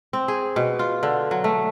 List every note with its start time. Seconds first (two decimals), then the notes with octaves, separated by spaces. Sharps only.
0.13 C4
0.28 G#4
0.56 B2
0.79 F4
1.03 D3
1.31 F#3
1.44 A3